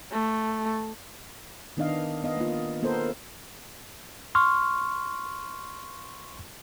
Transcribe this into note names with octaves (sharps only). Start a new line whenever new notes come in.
A3
D#3 B3 D4 D#5 F5
B3 D#5 F5
A#3 F4
A#3 B3 A4 A#4 C5
C6 C#6 F6